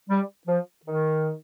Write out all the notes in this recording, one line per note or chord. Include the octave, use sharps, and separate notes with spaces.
G3
F3
D#3